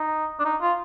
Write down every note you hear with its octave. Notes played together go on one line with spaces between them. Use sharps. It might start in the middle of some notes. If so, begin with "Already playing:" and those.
Already playing: D#4
D4
D#4
F4